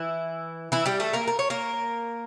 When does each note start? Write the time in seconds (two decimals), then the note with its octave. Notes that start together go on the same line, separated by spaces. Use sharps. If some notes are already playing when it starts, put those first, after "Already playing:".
Already playing: E3 E4
0.72 E3 E4
0.86 G3 G4
1.00 A3 A4
1.13 A#3 A#4
1.27 A#4
1.39 C#5
1.50 A#3 A#4